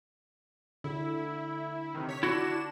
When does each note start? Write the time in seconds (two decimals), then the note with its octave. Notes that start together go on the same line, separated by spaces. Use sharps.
0.84 D3 E4
1.95 C3 D#3
2.09 C#5 B6
2.23 D4 E4 F#4 E7